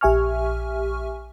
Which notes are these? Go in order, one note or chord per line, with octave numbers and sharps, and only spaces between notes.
A#1 G4 E5 G#5 C#6 F6